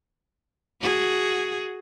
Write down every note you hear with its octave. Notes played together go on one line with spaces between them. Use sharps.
F#4 G#4